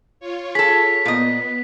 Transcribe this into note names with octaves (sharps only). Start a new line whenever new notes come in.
F4 C#5
G#4 A4 B6
A#2 B3 D#5